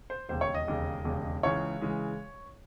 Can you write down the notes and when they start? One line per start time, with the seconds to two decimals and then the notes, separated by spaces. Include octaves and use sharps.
0.10 C5
0.29 E1 D#2 C#3 C5
0.41 C#5
0.55 D#5
0.67 E1 D#2 C#3
1.04 E1 D#2 C#3
1.43 C#2 C#3 E3 G#3 C#5
1.81 C#3 E3 G#3